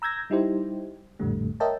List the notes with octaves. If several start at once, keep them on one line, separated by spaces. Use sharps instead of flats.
A#5 E6 G6 G#6 A#6
G3 D#4 E4 G4 C5
A#1 F2 A2 D3 G3 A3
A#4 C#5 D#5 E5 G5 A5